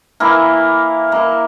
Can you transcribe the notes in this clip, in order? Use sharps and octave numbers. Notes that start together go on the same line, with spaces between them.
E3 A#3 E4 A#4
A#3 E4 A#4